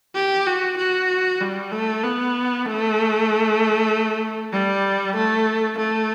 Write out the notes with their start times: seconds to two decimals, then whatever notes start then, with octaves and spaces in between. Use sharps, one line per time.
0.15 G4
0.46 F#4
0.77 F#4
1.41 G3
1.72 A3
2.03 B3
2.66 A3
4.53 G3
5.16 A3
5.78 A3